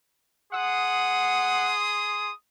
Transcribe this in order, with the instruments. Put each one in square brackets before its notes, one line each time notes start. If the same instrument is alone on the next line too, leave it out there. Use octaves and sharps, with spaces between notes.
[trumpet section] G#4 C6 D#6 [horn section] F#5